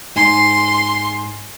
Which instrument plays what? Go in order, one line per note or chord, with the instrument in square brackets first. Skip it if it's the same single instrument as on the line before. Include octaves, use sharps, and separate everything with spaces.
[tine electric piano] G#2 G#5 C7 [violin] C6